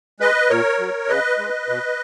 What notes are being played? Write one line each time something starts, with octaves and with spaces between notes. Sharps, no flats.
G#3 B4 D#5
A#2 A#4 C#5
F#3
C#3 B4 D#5
G#3
B2